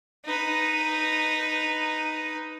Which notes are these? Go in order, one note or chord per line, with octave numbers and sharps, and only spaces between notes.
D#4 B4